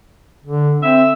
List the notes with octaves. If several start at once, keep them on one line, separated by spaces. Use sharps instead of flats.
D3
C4 E5